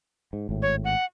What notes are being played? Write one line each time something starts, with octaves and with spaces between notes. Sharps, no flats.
G#2
G#1 A2
C#5
F#5